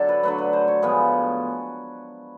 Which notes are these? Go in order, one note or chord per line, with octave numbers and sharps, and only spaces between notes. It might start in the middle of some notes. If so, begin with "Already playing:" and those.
Already playing: D3 F#3 A4
B4
D3 F#3 A3 B4
B4
C5
C#5
A2 F3 G#3 B3 B4